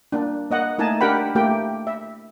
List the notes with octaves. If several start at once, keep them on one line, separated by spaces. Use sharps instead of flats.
A#3 D4
A#3 D#5 F#5
A3 A#3 D#4 D#5 G#5 A5
D4 G4 A#4 F#5 G5 B5
A3 A#3 G4 G5
E5